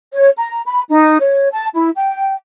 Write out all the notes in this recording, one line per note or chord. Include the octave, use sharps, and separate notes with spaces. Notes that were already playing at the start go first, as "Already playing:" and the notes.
C#5
A#5
B5
D#4
C#5
A5
E4
G5